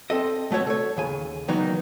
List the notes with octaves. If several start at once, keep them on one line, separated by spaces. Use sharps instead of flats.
C4 A4 D#5
C2 A3 F#4 C#5 A5
A4 C#5
D#2 C#3 G#5
D#3 E3 F#3 A#3 B3 D#4